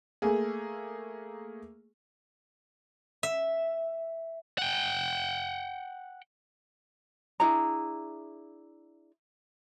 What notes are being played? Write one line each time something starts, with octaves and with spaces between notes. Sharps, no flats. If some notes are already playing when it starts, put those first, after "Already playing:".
A3 A#3 G#4
E5
F#5 G5
D4 E4 G#4 A#5